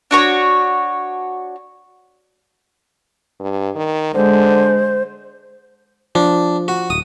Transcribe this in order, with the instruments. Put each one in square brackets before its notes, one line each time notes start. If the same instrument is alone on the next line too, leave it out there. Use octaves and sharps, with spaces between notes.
[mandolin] D4 F#4 C#5
[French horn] G2
D#3
[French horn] D3 [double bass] G#3 [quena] C5
[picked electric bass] F3 [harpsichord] D4
[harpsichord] F#4
[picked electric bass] D1 [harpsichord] D#6